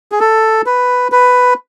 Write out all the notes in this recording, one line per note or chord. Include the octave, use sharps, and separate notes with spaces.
G#4
A4
B4
B4